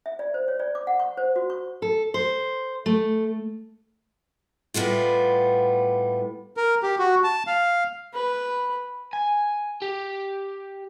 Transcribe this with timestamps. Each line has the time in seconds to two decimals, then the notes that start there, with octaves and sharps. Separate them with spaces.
0.06 E5
0.19 D5
0.34 C5
0.48 C#5
0.60 D5
0.75 D6
0.87 F#5
1.00 C#6
1.17 C5
1.36 F#4
1.50 C#6
1.82 A4
2.14 C5
2.86 A3
4.74 A2 G3 B3 F4
6.57 A#4
6.83 G4
6.99 F#4
7.24 A5
7.47 F5
8.13 B4
9.13 G#5
9.82 G4